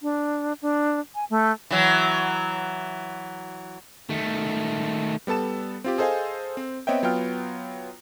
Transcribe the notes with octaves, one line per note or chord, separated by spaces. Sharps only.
D4
D4
G#5
A3
E3 F#3
D#3 A3
G3 B3 A4 A5 E7
C4 F4 G4
G#4 A4 C5 D#5 F5 G#5
C4
B3 C4 C#5 D#5 E5 G5
F#3 B3 F4 G5 F6